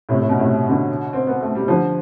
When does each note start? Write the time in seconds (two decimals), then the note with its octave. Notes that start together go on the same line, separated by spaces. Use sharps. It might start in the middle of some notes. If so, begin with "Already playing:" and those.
0.09 A2 C3
0.20 A2
0.29 B2
0.39 A2 C3
0.69 B2 D3
1.13 C4
1.27 B3
1.41 A3
1.55 G3
1.68 D3 F3